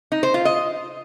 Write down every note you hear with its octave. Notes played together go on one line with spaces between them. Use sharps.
D#4
C5
F4
D#5